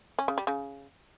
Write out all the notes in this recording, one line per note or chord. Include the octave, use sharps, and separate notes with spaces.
C#4
C#3
G3
C#3